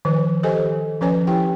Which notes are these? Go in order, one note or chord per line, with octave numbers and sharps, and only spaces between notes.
D#3 F3 B4
G4 A4 C5 D#5 G#5
F3 C#4 B4 C#5 G#5
E4 G4 G5